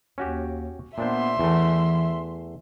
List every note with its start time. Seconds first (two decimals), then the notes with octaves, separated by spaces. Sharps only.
0.18 D#2 C#4 F#4 G4
0.98 A#2 B3 D4 C5 E5 C6
1.39 E2 E3 A3